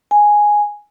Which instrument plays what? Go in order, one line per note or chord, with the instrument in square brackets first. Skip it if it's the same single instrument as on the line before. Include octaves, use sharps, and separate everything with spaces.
[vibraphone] G#5